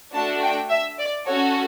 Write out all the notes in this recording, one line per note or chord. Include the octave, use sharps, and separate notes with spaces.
A3 D4 F#4 A5
G5
E5
D5
C#4 F#4 A4 C#5